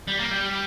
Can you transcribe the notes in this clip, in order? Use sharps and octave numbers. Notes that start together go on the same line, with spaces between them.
G3
A#3
G3